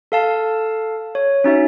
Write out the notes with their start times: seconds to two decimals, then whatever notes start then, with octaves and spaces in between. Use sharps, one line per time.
0.12 A4 F5 A5
1.15 C#5
1.44 C#4 D#4 F#4 E5